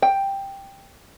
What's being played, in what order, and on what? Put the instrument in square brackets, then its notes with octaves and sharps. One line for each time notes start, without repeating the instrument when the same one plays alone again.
[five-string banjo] G5